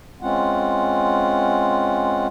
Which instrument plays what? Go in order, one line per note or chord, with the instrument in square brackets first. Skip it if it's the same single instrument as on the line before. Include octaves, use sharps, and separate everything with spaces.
[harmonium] G#3 C4 C#4 F4 F#5